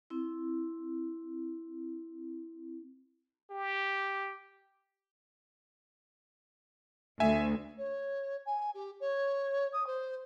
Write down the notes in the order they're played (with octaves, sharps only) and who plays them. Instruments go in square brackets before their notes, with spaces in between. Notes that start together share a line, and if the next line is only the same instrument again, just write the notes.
[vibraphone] C4 E4
[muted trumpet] G4
[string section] D2 [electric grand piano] E5 G#5
[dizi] C#5
G#5
G4
C#5
D#6
C5